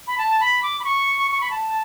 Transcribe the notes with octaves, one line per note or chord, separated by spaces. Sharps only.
B5
A5
B5
D6
B5
C#6
C#6
B5
A5